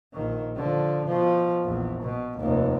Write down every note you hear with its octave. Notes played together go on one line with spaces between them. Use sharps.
A#1 D#3
D3 F3
B2 F3
A#1 E2
B2
F1 D#2